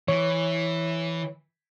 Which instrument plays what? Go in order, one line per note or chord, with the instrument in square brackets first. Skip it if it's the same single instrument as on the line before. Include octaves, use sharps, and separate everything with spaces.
[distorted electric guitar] E3 [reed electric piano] C#5